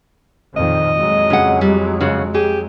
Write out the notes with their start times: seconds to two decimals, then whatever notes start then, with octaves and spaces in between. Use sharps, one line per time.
0.57 F2 A#2 D#3 D#5
0.97 F2 F#3 G#3
1.30 C#3 F#5
1.61 G3
2.01 C#3 F#4
2.34 G4 G#4